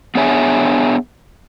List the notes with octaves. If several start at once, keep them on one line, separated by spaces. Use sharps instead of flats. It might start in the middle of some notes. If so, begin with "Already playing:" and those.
B3 D4 G#4 C#5 E5 G#5